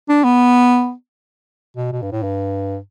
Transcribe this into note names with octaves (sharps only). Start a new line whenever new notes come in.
D4
B3
B2
B2
G2
A2
G2